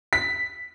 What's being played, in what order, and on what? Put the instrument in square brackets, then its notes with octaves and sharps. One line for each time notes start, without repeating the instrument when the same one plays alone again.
[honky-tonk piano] B6